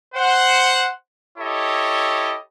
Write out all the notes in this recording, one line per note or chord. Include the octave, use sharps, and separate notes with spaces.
C5 F#5
E4 G4 A4 C#5 D#5